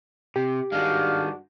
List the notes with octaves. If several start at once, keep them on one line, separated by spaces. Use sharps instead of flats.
C3 G4
G2 D#3 G#3 D4 F#4 F5